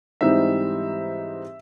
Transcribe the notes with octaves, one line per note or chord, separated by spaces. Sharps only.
G#2 E3 G3 C4 D#4 E5